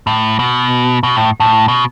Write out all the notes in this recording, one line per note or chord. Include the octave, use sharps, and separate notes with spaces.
A2
B2
B2
A2
A2
B2